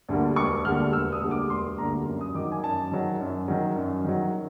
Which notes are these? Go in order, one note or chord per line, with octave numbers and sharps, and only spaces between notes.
D2 D3 G3 A#3
E1 C#6
D2 D3 G3 A#3 F6
E1 E6
D#6
D2 D3 G3 A#3
D6
E1 C6
D2 D3 G3 A#3 A#5
F#2 A#5
D#6
D#3 F#3 D6
G#5
F#2 A5
D#3 F#3
F#2
D#3 F#3
F#2
D#3 F#3